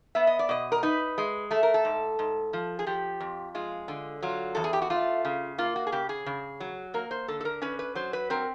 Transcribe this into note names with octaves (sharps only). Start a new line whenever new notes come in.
B3 E5
D#5
D5
B2 D#5
A#4
D#4 B4
G#3
A3 A4
A#4
A4
G#2
G#2
F3
G#4
F3 G4
F2
G#3 F4
D3
F#3 F4
E2 A4
G#4
G4
F#4
A3 F4
C#3
A#3 F4
F#4
G#4
C#3 G4
G#4
C#3
F#3
A#3 A#4
C5
D3 A4
A4
A#4
C#4 B4
B4
F#3 C5
B4
C4 A#4